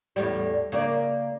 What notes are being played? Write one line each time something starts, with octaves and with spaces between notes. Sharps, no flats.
E2 A2 G3
C#3 A#3 D5